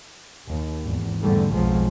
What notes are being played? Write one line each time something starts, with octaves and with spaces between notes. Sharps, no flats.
D#2
G#1 E2
E2 G#2 D3 G3 A3
B1 F2 F3 F#3 G#3